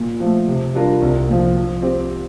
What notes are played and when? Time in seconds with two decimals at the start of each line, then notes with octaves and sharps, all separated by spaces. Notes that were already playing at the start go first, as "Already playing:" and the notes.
Already playing: A#2
0.20 F3 A3
0.47 C3
0.74 G3 D4 F4 A#4
1.01 C2
1.28 A#2 F3
1.56 F3
1.82 C4 G4